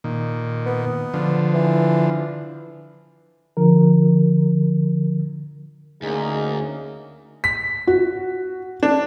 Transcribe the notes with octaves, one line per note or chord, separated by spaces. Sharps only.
A#2 D#3
B3
D3 F3
E3
D3 F3 A#4
D2 A#3 C#4 D#4 G#4
B6
F#4
D4